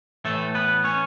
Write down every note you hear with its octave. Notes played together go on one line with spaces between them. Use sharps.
A2 E3 A3 A4
B3 B4
C#4 C#5